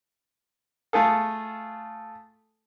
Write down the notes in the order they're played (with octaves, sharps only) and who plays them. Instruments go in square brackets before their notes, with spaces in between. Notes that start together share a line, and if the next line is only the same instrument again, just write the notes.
[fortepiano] A3 F4 G#4 A4